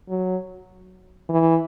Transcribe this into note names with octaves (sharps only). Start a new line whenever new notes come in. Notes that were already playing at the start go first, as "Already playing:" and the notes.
F#3
E3